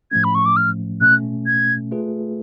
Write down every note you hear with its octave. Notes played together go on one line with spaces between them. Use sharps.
A2 F3 A3 C#4 G#6
B5
C#6
D6
F6
B2 A3 C#4 F#6
G#6
A3 F4 G#4 B4